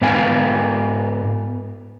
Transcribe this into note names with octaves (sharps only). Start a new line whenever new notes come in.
G#2 B3 F5 G5 G#5